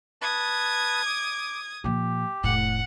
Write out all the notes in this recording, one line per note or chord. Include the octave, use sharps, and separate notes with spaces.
B4 A5 D#6 G#6
D6
A#2 F3 G4
F1 A2 F#5